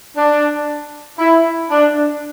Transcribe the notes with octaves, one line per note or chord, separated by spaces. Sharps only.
D4
E4
D4